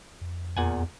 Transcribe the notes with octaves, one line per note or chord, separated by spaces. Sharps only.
F2
E2 A#2 F#5 G#5